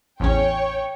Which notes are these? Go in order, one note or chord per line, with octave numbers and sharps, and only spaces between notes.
A1 E2 C#4 C#5 G5